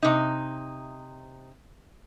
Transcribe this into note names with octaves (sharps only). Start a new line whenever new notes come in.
C3 D#4